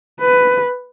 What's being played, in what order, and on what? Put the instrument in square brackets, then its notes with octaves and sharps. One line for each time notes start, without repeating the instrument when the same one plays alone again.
[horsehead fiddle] B4